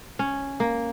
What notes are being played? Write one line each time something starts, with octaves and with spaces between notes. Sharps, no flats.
C#4
A#3